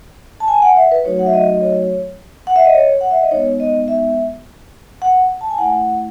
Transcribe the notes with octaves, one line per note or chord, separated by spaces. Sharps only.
A5
G#5
F#5
E5
B4
F#3 A3 D#4 F#4 C#5
F#5
E5
D#5
D#5
C#5
F#5
E5
D#5
C#5
F#5
E5
D#5
G#3 B3 D#4 C#5
D#5
E5
F#5
A5
G#5
A3 E4 F#5